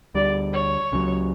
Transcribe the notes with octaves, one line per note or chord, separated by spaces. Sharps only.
D2 D3 G3 D5
C#5
C#2 C#3 F#3